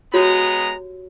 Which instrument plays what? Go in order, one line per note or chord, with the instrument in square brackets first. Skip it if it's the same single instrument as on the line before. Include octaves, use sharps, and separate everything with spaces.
[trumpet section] G#3 B3 A#5 [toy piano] F#4 G4 C#5